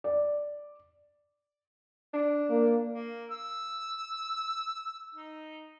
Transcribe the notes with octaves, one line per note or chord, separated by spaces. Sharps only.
D5
D4
A#3
A#3
E6
D#4